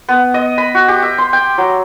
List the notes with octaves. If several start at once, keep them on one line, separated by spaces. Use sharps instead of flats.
B3
D#5
B5
F#4
G4
E5
C6
G5
F#3